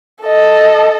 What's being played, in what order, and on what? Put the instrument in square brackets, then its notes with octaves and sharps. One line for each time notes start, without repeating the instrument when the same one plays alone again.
[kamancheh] A4 D#5